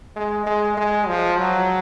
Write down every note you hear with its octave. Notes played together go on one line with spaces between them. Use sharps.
G#3
G#3
G#3
F3
F#3